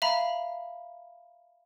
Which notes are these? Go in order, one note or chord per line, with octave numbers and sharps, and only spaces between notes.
E5 F5 A#5 B5